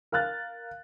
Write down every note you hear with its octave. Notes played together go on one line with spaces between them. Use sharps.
A#4 F5 F6 F#6 A6